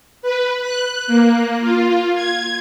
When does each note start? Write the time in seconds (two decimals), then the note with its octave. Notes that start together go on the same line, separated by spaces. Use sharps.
0.22 B4
0.62 F#6
1.07 A#3
1.61 F4
2.14 G#6